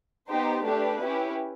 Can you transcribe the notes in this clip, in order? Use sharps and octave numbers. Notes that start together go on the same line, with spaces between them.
B3 D#4 G4 C5
A3 D4 G4 B4
C#4 E4 G4